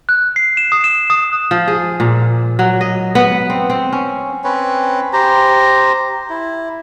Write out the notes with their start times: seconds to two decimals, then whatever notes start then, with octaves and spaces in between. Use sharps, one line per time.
0.09 F#6
0.36 C7
0.57 E7
0.72 D#6
0.84 E7
1.10 D#6
1.51 F3
1.68 G#4
2.00 A#2
2.59 F#3
2.81 D#5
3.15 B3
3.50 C4
3.70 C4
3.93 C#4
4.44 C4 C#4 B4 C#5
5.13 G4 C5 A#5
6.30 E4